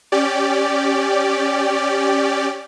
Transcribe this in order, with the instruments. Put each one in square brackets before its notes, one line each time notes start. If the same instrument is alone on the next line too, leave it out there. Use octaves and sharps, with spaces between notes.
[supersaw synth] C#4 G4 D5